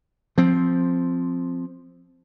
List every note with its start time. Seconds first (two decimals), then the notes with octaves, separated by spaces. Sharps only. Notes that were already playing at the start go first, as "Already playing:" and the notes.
0.38 F3 C4